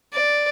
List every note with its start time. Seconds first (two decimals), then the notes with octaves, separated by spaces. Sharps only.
0.13 D5